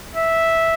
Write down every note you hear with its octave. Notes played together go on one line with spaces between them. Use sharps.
E5